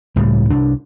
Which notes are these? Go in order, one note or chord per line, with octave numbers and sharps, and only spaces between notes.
C#2 A2 G3
C2 D4